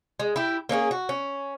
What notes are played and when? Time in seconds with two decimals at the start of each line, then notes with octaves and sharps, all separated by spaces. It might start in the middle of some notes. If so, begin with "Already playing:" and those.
0.20 G#3
0.36 E4 G4
0.69 A#3 C#4 D4 G#4
0.91 F#4
1.09 C#4